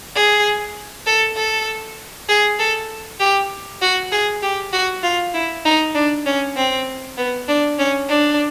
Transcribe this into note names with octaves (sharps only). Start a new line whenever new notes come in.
G#4
A4
A4
G#4
A4
G4
F#4
G#4
G4
F#4
F4
E4
D#4
D4
C#4
C4
B3
D4
C#4
D4